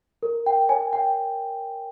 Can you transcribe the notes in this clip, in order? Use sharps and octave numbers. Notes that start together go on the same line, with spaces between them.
A#4
G5
C#5 G#5
G5